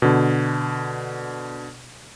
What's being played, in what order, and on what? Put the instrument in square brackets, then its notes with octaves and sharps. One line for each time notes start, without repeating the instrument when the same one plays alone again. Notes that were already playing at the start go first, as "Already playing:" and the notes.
[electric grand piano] B2 D3